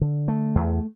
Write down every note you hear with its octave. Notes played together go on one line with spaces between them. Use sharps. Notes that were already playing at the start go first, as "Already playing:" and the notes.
D3
A3
E2